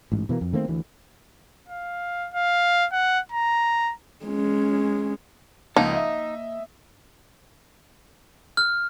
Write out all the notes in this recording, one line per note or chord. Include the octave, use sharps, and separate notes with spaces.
A1 G#2
B2 E3 G#3 A#3
F2
D#3 A3 A#3 C4
D2 E3
F5
F5
F#5
A#5
G#3 C#4
C#2 F3 A#3 D#4 F#5 A5
D#5 E5
F6